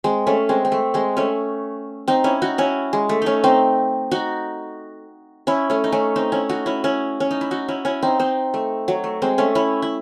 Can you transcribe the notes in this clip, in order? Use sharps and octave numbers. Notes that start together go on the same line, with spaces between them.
G#3 C4
A3 C#4
G#3 C4
C4
A3
G#3 C4
A3 C#4
C4 D#4
C#4 E4
D#4 F#4
C#4 E4
G#3
A3
A3 C#4 D#4
C4 D#4
D#4 F#4
C#4 E4
A3 C#4
D#4
A3 C#4
C4 D#4
C#4 E4
D#4 F#4
C#4 E4
C#4 E4
C#4
D#4
E4
D#4 F#4
C#4 E4
C#4 E4
C4 D#4
C4 D#4
A3
F#3
A3
G#3 C4
A3 C#4
C#4 E4
E4